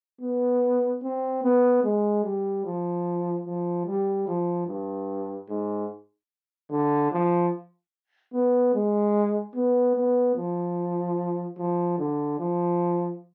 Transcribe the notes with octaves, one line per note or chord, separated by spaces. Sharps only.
B3
C4
B3
G#3
G3
F3
F3
G3
F3
G2
G#2
D3
F3
B3
G#3
B3
B3
F3
F3
D3
F3